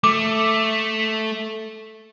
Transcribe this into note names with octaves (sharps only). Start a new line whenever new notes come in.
A3 D6